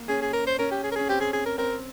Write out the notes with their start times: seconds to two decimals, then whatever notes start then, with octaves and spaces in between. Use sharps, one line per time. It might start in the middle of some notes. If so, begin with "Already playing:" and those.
Already playing: A#3
0.08 C#4 G#4
0.22 G#4
0.33 A#4
0.46 C5
0.58 C#4 A#4
0.71 G4
0.83 G#4
0.92 A#4
0.95 C#4 G#4
1.09 C4 G4
1.20 G#4
1.33 G#4
1.46 A#4
1.58 C4 A#4